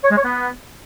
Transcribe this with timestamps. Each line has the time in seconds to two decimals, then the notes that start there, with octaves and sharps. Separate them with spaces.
0.04 C#5
0.11 G#3
0.17 C#5
0.24 B3